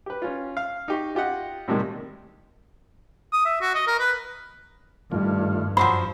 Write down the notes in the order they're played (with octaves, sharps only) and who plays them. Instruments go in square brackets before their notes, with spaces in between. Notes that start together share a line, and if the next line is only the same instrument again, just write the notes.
[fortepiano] G4 B4
C#4 F4
F5
D#4 G4 C#6
F4 G4 D#5 F#5
A2 C3 D#3 G3 G#3 A#3
[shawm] D#6
E5
F#4
D#5
A#4
B4
[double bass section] G2 [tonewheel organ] D#3 A3 F4
[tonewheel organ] F#2 [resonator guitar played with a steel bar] F3 F#3 C5 [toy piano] B5